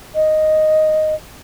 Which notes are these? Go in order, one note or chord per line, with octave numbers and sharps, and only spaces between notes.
D#5